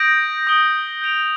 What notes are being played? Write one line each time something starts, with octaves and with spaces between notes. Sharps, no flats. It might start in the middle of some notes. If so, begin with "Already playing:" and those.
Already playing: D#6 G6 A#6 D7
D#6 A#6 D7 G7
G6 D7 F7